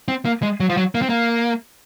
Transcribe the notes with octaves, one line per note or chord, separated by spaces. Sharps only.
C4
A#3
G#3
F#3
F3
F#3
A#3
C4
A#3